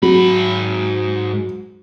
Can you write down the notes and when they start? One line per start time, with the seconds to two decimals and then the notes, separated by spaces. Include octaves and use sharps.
0.03 G#2 F#3 B5